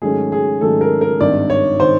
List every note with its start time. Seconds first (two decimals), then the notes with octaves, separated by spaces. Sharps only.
0.02 G#2 D#3 F#3 A3 C#4 G#4
0.32 G#4
0.61 G#2 D#3 F#3 A3 C#4 A4
0.81 A#4
1.01 A#4
1.20 G#1 G2 D#3 D5
1.50 C#5
1.80 D#3 C5